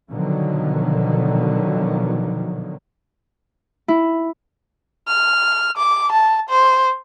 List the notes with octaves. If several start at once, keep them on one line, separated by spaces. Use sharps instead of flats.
B2 D3 D#3 F3 F#3
E4
F6
D6
A5
C5